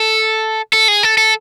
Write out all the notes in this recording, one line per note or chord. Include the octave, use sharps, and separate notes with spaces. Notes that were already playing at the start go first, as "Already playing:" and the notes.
Already playing: A4
A4
G#4
A4
A4